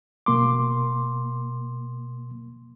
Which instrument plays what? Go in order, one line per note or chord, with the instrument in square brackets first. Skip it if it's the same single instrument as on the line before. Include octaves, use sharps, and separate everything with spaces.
[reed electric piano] B2 A#3 C6 D6